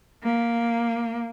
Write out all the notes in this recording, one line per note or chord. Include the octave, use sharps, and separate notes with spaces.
A#3